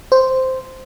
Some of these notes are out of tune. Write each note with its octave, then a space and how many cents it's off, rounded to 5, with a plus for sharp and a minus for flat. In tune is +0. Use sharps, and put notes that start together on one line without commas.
C5 -5